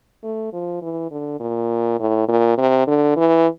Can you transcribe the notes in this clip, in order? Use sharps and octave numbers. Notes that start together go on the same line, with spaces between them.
A3
F3
E3
D3
A#2
A2
A#2
C3
D3
E3